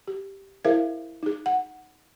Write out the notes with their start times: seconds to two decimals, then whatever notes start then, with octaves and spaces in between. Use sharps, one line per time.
0.08 G4
0.64 E4 G#4 A#4 C5 E5 F5
1.23 D#4 G#4
1.46 F#5